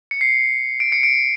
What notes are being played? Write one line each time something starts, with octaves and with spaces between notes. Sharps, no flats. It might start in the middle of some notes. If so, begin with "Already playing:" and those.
C#7
C7
D7
C#7
D7